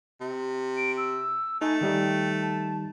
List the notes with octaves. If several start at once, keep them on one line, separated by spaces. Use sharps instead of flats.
C3
D7
E6
A3 D#4 G#5
D#3 G3 D#4 G5
A5